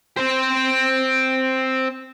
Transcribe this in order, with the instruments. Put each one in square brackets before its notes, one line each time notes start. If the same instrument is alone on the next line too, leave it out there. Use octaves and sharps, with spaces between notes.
[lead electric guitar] C4 C5